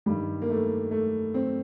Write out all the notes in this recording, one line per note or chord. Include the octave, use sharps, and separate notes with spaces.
G2 D#3 G3
A#3
A3
A3
C4